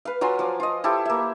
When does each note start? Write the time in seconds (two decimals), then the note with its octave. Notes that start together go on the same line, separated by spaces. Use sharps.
0.05 B4 F5
0.21 F#3 F4 G#5 C6
0.39 F3 D6
0.60 F4 D#5
0.84 E4 G4 A4
1.05 A#3 E5